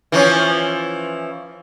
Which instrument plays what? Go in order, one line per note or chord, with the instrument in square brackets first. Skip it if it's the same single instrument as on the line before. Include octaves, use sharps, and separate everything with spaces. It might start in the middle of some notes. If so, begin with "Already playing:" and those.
[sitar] E3 F3 C#4